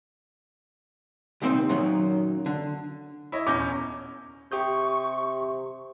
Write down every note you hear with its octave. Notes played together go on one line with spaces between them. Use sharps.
C2 A#2 D#3 C4 G#4 C5
F#2 A#2 D#3 F#3
D3
E4 C#5 D#5
D#1 E2 C#4 D6 G6 A#6
C3 G4 C#6 D#6 G6